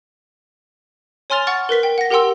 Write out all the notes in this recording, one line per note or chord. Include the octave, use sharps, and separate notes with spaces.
C#5 G#5 C6 F6 A6 F7
F#5 C#6 F6 A6
A#4 B4 B6 G7
G5
F#5 A#6
G4 A#4 F#5 G5 C6 E6